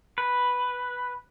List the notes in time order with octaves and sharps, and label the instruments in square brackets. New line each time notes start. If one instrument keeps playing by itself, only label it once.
[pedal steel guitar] B4